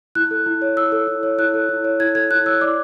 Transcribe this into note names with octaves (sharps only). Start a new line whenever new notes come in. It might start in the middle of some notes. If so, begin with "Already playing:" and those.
E4 F#6
A4
E4
C#5
E4 E6
A4
E4
C#5
E4 F#6
A4
E4
C#5
E4 G#6
A4 G#6
E4 F#6
C#5 E6
D5 D6